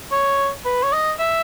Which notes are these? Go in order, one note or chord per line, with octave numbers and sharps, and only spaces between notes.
C#5
B4
C#5
D#5
E5